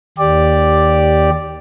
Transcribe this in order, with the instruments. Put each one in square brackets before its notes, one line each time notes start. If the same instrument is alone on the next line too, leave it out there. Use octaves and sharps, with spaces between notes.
[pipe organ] D#2 G4 D5